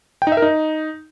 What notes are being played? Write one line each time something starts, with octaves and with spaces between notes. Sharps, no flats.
G5
D#4
E5
A#4
D#4